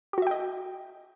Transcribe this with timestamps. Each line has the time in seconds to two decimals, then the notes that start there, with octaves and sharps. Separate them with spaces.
0.13 G4
0.18 F#4
0.22 E5
0.27 G5
0.31 D#5